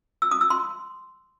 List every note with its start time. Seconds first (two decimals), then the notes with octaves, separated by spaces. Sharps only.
0.22 E6
0.31 D#6
0.41 E6
0.50 C6